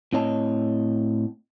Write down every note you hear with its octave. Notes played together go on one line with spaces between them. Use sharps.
A2 C4 C#5 D#5 A5